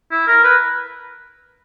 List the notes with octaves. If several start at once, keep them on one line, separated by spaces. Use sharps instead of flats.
E4
A#4
B4